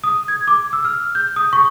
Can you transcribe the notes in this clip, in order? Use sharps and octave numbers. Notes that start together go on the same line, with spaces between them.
D#6
G#6
D6
E6
F6
G6
D#6
C#6